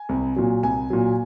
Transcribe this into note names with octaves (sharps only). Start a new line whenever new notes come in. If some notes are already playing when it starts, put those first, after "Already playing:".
Already playing: G#5
C2
A#2 F#3
C2 G#5
A#2 F#3